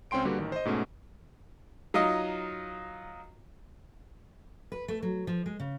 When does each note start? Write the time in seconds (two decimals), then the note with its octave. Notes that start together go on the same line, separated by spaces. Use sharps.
0.11 C#2 C4 C#4 G5 C6 D7
0.25 D3 G3 A#3 F#4 G4 B4
0.38 A1 D#3
0.52 C5 D#5
0.65 G#2 B2 A3 C#4
1.94 F#3 D#4 F4 D#5
4.72 B4
4.88 A3
5.02 F#3
5.27 F3
5.46 G#3
5.60 C#3